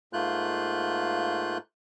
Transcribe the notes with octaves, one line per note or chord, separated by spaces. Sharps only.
G#2 A3 A#3 F4 F#6 G6